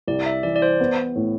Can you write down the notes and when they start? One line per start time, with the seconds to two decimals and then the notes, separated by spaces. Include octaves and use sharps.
0.08 C2 D5
0.26 E5
0.43 E3 D5
0.56 D5
0.62 C5
0.80 B3
1.16 A2